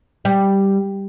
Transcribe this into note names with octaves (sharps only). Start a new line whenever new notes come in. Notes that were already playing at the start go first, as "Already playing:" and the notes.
G3